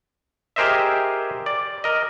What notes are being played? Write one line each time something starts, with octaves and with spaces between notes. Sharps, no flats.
G4 G#4 A#4 C5 D#5 E5
D5
A#4 D#5